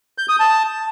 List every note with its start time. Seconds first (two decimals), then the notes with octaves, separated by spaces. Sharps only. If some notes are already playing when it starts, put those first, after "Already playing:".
0.18 G6
0.29 D#6
0.40 A5